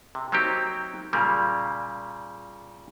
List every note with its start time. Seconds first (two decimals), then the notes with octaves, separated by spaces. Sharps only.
0.15 C3
0.32 F#3 A#3 C4 D#4 G4
1.13 A#2 C#3 G3 A#3